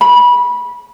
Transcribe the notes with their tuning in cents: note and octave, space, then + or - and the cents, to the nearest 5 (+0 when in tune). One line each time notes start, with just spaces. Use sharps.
B5 -20